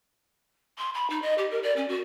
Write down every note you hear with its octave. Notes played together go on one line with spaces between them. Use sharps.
C6
B5
D#4
D#5
G4
A#4
D5
C#4
F#4